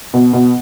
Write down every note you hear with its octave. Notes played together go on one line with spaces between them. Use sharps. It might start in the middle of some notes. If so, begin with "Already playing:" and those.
B2
B2